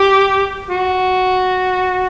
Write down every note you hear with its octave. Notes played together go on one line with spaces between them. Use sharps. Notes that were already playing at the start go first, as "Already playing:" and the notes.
Already playing: G4
F#4